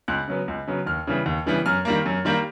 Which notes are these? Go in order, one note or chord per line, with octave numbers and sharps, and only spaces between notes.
C#2 F#6
C#3 F#3 B3
C#2
C#3 F#3 B3
D#2 F6
C#3 E3 G3 B3
D#2
C#3 E3 G3 B3
F#2 F6
D#3 G3 A#3
F#2
D#3 G3 A#3